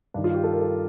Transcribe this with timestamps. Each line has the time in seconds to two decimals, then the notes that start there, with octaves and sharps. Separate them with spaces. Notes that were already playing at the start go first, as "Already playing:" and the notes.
0.14 G2 D4
0.17 D#3
0.24 F4
0.34 G4
0.44 A4
0.53 A#4
0.61 A4